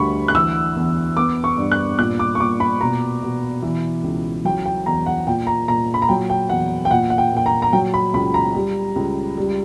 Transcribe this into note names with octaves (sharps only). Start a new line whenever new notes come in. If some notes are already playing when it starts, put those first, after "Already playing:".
Already playing: D2 G3 B5 C#6
F#6
E3 E6
E2
B3 D6
C#6
G2
F#6
A#2 F#6
D6
C#6
A#2 D6
B5
B2 A#5
B2
E3
C#2
F#3 G5
G5
E2 A#5
F#5
A#2 G5
A#5
A#2 A#5
B5
A#5
F#3 G5
G5
E2 F#5
G5
A#2 F#5
F#5
G5
A#2 G5
A#5
A#5
F#3 G5
B5
C#2 B5
A#5
G3
C#2
G3